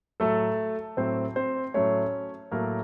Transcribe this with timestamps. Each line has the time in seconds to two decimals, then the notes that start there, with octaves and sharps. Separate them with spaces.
0.20 A2 F#3 A3 A4
0.97 A2 F#3 A3 C4 C5
1.36 C4 C5
1.74 A2 F#3 A3 C#4 C#5
2.51 A2 F#3 A3 A#3 A#4